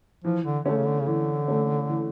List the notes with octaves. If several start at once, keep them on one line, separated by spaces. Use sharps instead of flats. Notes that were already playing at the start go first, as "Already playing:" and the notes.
E3 F3
D3
D3 A3 C#4
C#3
D3
C#3
D3 E3
A3 C#4
E3